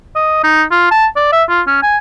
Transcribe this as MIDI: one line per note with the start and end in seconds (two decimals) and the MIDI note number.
0.16 0.42 75
0.44 0.63 63
0.71 0.89 65
0.91 1.06 81
1.16 1.29 74
1.32 1.43 76
1.49 1.62 65
1.67 1.79 61
1.83 1.98 80